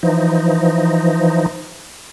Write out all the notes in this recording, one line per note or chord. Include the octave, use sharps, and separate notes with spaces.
E3 F3 D#4